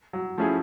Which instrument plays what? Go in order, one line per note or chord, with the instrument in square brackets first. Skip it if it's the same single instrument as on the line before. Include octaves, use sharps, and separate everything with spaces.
[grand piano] F#3
[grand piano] F3 [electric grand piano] A3 C#4 E4 G#4